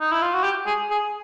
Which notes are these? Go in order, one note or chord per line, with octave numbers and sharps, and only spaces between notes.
D#4
E4
F4
F#4
G4
G#4
G#4